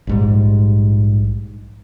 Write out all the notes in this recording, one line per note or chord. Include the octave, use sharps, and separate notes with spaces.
A#1 G#2 G3